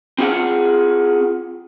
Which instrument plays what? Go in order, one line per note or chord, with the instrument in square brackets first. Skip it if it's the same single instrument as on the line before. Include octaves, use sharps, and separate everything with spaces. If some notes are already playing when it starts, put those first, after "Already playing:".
[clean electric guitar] C4 F4 G#4 F#5